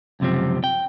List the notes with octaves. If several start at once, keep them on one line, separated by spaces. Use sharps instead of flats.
C#2 F#2 C3 F3 C4
G5